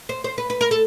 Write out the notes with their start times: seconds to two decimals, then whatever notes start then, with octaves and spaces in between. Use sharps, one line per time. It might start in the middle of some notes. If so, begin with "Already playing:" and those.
0.09 C5
0.24 C5
0.38 B4
0.50 B4
0.61 A#4
0.71 A4